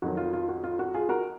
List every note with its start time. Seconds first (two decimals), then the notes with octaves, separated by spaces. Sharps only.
0.02 F2 D#3 F#3 F#4
0.17 F4
0.33 F4
0.49 F#4
0.64 F4
0.79 F#4
0.94 F4 G#4
1.09 F#4 A#4